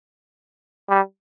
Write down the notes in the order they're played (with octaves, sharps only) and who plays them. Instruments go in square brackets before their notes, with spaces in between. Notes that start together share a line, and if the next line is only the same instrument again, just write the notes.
[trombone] G3